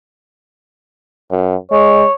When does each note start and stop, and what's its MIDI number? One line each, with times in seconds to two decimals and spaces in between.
1.31 1.56 42
1.71 2.04 56
1.71 2.12 73